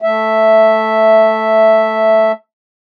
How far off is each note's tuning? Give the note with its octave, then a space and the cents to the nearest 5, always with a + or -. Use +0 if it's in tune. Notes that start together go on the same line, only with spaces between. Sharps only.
A3 +0 E5 +0